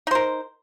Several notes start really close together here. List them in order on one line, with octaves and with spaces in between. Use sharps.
D#4 C5 A#4